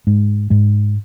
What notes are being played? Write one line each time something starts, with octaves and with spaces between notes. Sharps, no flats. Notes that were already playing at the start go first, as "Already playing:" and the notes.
G#2 G#3
G#2 G#3